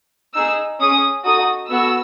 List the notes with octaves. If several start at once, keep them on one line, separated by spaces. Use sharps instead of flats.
D#4 G#4 E6
C#4 G#4 D#6
D#4 F#4 A4 D#6
B3 F#4 A4 E6